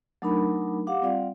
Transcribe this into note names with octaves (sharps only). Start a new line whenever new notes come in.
F#3 A3 D4 D#4 A#4 B5
G4 F5 F#5 D6
G3 C4 F4 D5 F5 F#5